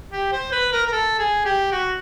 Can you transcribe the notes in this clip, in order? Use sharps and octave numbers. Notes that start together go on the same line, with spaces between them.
G4
C5
B4
A#4
A#4
A4
G#4
G4
F#4